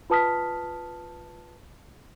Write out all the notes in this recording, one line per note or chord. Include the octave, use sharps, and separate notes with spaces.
F4 B4 A5 D#6 F6 B6